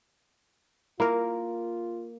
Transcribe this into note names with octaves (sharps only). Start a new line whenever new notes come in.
A#3 E4 F4 A#4